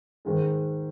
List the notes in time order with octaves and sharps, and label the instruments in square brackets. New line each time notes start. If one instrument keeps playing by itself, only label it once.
[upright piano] G#2 D#3 G#3